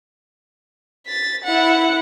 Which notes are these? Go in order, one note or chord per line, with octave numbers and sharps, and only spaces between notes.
A6 B6
E4 F#5